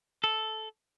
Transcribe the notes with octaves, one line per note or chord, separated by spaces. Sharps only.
A4